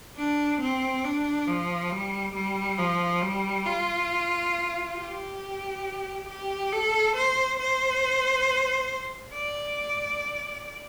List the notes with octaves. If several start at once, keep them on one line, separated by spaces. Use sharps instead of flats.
D4
C4
D4
F3
G3
G3
F3
G3
F4
G4
G4
A4
C5
C5
D5